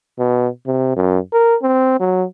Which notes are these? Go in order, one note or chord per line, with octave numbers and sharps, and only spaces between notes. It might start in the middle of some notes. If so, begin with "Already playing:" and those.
B2
C3
F#2
A#4
C4
F#3